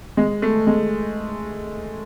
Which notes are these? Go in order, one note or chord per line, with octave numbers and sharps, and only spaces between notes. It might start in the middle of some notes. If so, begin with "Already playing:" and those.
G#3
A3
G#3